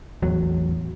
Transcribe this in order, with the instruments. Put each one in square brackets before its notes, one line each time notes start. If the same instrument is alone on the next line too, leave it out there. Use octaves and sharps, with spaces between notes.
[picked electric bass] A1 E2 F#3